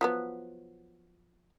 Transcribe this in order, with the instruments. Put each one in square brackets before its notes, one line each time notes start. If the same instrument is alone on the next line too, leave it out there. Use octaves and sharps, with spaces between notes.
[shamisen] F3 F#3 B3